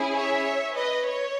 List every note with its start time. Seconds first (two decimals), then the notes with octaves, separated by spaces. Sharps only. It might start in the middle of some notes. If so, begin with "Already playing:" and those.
Already playing: C#4 E4 G#4
0.14 C#5 E5
0.76 B4 D#5
1.07 C#5